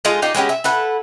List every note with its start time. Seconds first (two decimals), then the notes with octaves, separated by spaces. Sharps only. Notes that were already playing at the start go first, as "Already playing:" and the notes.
0.05 G#3 D#4 F4 A5
0.22 D#4 F4 G4 D5
0.34 G#3 B3 C#4 G4
0.49 E5
0.64 E4 A4 B4 F#5